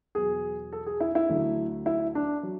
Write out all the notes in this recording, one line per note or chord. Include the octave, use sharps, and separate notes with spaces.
E2 B2 F#3 G#4
A4
G#4
E4
E4
D2 D3 F#3
E4
D4
F#3